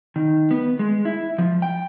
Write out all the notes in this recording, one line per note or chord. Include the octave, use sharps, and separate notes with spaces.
D#3
B3
G#3
E4
F3
G5